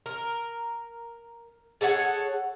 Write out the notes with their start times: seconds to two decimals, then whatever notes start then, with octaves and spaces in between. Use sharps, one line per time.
0.06 A#4
1.81 G#4 A4 C#5 F#5